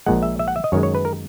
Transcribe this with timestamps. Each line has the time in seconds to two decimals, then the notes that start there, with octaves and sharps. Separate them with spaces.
0.06 A#1 A#2 G#3 F#5
0.23 E5
0.39 E5
0.48 F#5
0.56 E5
0.64 D#5
0.72 F#2 D#3 G#3 C#5
0.83 C#5
0.95 B4
1.05 A#4